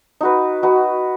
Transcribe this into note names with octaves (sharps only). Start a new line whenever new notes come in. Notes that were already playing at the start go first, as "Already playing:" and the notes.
D#4 F#4 B4
D#4 F#4 B4